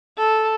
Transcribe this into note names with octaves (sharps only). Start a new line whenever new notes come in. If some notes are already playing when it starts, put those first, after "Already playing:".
A4